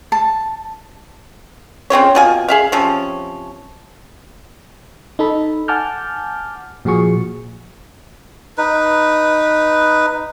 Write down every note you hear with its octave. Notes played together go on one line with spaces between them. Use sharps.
A5
C#3 C4 F4 C#5
B2 F4 G#5
G#4 E5 F5
C3 F3 C#4
D#4 A4 B5
F#5 G#5 A5 D6 F6 G6
A#2 F3 F#4 G#4 C#6
D#4 B4